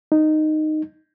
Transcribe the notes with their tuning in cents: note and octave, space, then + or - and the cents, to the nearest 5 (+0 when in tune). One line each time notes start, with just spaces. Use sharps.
D#4 -10